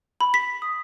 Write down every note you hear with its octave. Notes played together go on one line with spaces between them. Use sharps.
B5
B6
D#6